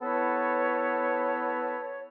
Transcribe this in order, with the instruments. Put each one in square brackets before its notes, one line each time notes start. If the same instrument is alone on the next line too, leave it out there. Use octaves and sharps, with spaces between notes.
[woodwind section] B3 E4 A4 B4 C#5